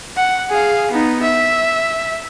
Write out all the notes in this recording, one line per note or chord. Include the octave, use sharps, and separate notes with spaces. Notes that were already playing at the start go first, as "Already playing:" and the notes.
F#5
G#4 F5
B3 D#4
E5